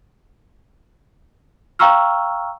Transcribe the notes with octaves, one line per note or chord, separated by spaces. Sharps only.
F5 G5 A#5 C#6 E6 F6